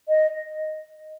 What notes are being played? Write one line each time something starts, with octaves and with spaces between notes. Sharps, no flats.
D#5